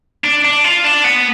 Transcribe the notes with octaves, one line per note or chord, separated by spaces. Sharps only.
D4
D4
F4
D4
B3